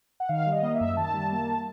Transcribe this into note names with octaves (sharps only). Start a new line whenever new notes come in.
F#5
D#3 F5
G3
D#5
A#3
E5
F#2
D#3 A5
G3
A#3